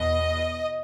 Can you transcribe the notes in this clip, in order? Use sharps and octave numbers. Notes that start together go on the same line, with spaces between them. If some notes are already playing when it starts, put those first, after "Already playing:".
Already playing: E2 B2 D#5